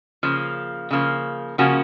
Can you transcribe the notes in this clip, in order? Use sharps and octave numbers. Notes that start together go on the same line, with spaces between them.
C#3 F3 A#3
C#3 F3 A#3
C#3 F3 A#3 C#4 F#4